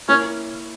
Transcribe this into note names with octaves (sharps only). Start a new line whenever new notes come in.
A#3 C#4 E4 A#4 C#5